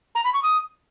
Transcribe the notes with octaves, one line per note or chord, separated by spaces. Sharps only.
A#5
B5
C#6
D#6